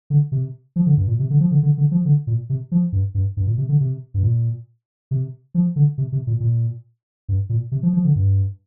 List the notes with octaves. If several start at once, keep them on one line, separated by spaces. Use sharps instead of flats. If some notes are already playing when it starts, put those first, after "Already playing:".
D3
C3
F3
D3
G2
A#2
C3
D3
F3
D3
D3
D3
F3
D3
A#2
C3
F3
G2
G2
G2
A#2
C3
D3
C3
G2
A#2
C3
F3
D3
C3
C3
A#2
A#2
G2
A#2
C3
F3
F3
D3
G2